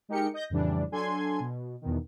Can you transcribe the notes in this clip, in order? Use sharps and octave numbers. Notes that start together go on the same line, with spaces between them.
G#3 D#4 G4 A#4 G5 C#7
D#5 G6 A#6
F2 A2 C#3 E3 G3 D4
F#3 D4 A4 G#5 C6 G#6
B2
E2 B2 D#3